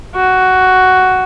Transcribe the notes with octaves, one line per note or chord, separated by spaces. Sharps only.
F#4